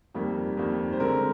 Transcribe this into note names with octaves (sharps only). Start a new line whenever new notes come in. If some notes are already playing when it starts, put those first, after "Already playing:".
F2 D#3 G3 A#3
F2 D#3 G3 A#3
C5
D3 G#3 C4 A#4